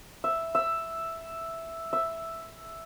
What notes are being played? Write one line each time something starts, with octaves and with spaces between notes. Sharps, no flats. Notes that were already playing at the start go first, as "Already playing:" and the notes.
E5
E5
E5